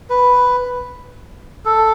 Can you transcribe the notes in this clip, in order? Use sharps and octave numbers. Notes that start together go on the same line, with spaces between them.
B4
A4